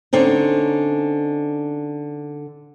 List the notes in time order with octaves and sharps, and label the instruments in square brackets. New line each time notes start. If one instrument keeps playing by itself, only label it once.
[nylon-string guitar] D3 C4 C#4 D#4